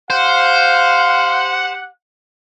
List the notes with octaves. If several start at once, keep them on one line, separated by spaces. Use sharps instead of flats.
G4 C5 F5 F#5